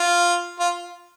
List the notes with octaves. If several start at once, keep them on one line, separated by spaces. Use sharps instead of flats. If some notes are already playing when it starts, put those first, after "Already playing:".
Already playing: F4
F4